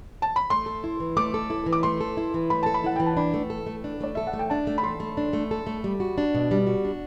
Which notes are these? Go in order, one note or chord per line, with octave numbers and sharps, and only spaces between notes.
A5
B5
A3 C6
A4
E4
E3
A3 D6
A4
E4
E3
D6
A3 C6
A4
E4
E3
A3 B5
A4 A5
B5
E4 F#5
E3 G5
A5
D4 B5
A3
A4
A3
D4
A3 D5
A4 E5
F#5
A3
G5
D4 A5
A3
B5
A4 C6
A3
D4
A3
A4
A3
G3
F#4
D4
B2
G3
F#4
D4